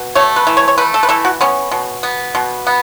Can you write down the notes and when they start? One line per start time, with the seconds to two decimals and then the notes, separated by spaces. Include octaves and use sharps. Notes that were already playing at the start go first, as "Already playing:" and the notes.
Already playing: B2
0.15 A3 C#5
0.36 B4
0.47 E3
0.57 C#5
0.68 C#5
0.78 A3 B4
0.94 A4
1.03 B4
1.09 E3 A4
1.25 F#4
1.41 B3 C#4
1.72 B2
2.03 B3
2.35 B2
2.67 B3